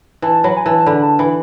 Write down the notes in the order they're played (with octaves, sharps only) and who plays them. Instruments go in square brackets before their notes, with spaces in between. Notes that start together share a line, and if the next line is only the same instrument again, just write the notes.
[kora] E3 [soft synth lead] A5
[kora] F#3 [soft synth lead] B5
[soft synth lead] G#5
[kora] E3 [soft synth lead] A5
[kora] D3 [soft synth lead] B5
[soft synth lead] A5
[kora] E3 [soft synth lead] B5